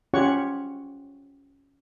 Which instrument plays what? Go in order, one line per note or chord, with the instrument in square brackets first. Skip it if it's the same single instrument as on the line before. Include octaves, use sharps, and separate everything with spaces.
[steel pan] C#4 F4 G4 C#5 F#5 C#6